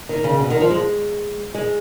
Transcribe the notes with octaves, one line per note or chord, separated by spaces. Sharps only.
D#3
C#3
B2
D#3
F3
G#3
G#3